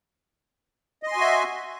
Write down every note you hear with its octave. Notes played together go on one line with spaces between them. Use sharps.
F#4 D#5 E5 G#5 C6